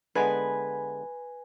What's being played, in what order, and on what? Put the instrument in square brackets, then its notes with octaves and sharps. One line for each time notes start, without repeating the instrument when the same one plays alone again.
[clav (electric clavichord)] D3 G#3 B3 [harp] B4 G#5